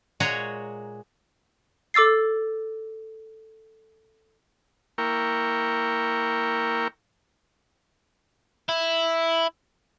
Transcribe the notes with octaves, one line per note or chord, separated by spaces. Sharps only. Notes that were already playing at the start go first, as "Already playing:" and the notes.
A#2 G#3 F#4 G#4 C#5 A#5
A4 D6 E6 A6 C7
A#3 E4 A#4 G5 C#6
E4